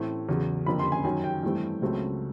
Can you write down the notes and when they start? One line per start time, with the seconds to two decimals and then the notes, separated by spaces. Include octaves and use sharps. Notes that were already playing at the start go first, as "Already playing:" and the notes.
Already playing: A2 E3 A3 C4
0.29 E2 C#3 F#3
0.66 F2 D3 F3 A#3 B5
0.79 C6
0.92 G#5
1.04 F#2 D#3 F#3 G#5
1.24 G5
1.43 G2 E3 A3 C4
1.82 C#2 C#3 F#3 A3 C4